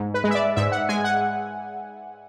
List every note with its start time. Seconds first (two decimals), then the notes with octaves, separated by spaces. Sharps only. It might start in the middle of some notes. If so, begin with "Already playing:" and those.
Already playing: G#2
0.14 B4
0.24 G#3
0.31 E5
0.35 D5
0.56 G#2 E5
0.72 F#5
0.89 G#3 G#5
1.04 F#5